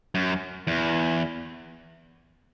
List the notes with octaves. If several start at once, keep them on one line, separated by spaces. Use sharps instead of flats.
F#2
E2